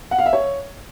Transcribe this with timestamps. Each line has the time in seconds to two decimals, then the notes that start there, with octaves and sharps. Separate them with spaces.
0.11 F#5
0.19 F5
0.26 E5
0.33 C#5